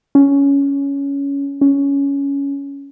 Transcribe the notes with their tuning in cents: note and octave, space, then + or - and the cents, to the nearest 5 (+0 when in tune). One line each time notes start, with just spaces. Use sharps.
C#4 +10
C#4 +10